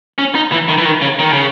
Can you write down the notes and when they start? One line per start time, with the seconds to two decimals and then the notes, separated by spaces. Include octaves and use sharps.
0.18 C#4
0.35 D#4
0.52 E3
0.69 D#3
0.78 E3
0.85 D#3
1.02 C#3
1.19 D#3
1.33 C#3